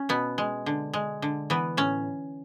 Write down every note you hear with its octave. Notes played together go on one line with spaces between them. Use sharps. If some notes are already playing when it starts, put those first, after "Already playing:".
Already playing: C#4
B2 B3
G#3
D3
G#3
D3
E3 B3
A2 C#4